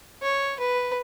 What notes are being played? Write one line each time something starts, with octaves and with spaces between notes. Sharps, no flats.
C#5
B4